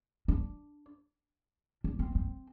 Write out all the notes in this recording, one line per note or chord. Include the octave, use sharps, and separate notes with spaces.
D4
D4
C4
C4